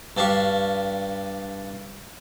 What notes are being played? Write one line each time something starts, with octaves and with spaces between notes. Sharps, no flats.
G2 D4 G4 F5 C#6